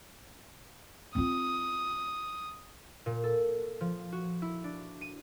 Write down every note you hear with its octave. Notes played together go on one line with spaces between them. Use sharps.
C4 F4 D#6
A#2
A4
F3
F#4
E4
D4
D#7